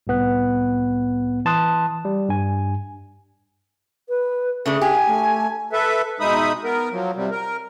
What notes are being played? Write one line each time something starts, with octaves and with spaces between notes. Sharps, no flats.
C2 A2 B3 F#6
E3 A5 C6 D#6 F#6
G3
G2 G#5
B4
C#3 A3 D4 G#4
G4 G#5
A3
A4 B4 E5
B2 G#3 D#4 E5 B5 D#6
B3 A#4
F3 F#3
C3 G3
A#4